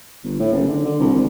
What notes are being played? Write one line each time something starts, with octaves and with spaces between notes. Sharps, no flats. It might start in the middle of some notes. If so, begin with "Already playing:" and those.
G1
A2
F#1
D3
D3
C2
G#1